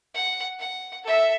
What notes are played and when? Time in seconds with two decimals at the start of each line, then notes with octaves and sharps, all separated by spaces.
0.14 F#5
0.59 F#5
1.04 A4 E5